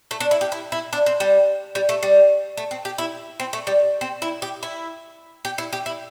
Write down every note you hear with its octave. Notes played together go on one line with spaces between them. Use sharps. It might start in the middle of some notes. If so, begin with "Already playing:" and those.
A3
D4
E4
G4
E4
E4
D4
C4
G3
G3
A3
G3
A3
C4
G4
E4
C4
A3
G3
C4
E4
G4
E4
G4
E4
G4
E4